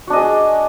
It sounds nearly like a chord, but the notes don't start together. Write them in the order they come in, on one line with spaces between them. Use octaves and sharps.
F#4 D4 D#5 G#4